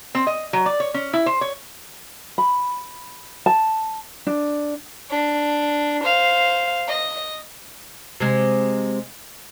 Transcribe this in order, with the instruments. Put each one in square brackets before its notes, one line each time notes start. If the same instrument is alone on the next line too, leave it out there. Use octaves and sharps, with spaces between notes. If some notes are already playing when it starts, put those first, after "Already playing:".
[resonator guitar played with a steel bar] C4
D#5
F#3
D5
C#5
C#4
E4
C5
C#5
[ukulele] B5
A5
D4
[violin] D4
C5 F5
D#5
[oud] C3 G#3